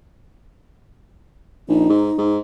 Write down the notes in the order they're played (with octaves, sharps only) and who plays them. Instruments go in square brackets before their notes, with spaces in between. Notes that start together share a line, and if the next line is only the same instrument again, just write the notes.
[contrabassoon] A#1 [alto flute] D#4
[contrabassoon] G#2
G#2